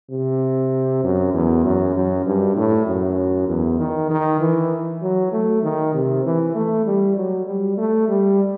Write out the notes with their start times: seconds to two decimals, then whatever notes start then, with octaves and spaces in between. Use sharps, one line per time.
0.11 C3
1.03 F#2
1.34 E2
1.65 F#2
1.95 F#2
2.26 G2
2.57 A2
2.87 F#2
3.49 E2
3.79 D#3
4.10 D#3
4.40 E3
5.02 F#3
5.33 A3
5.63 D#3
5.94 C3
6.25 E3
6.55 A3
6.86 G3
7.17 F#3
7.47 G3
7.78 A3
8.09 G3